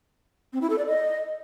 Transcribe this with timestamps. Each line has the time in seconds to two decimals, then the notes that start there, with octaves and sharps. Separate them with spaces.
0.53 C4
0.61 E4
0.70 A4
0.78 D5
0.87 D#5